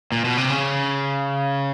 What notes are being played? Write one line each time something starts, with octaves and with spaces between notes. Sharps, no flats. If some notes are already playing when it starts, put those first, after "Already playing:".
A#2
B2
C3
C#3